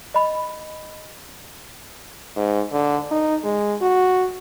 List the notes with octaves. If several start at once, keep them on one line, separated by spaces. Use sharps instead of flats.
D#5 B5
G#2
D3
D#4
G#3
F#4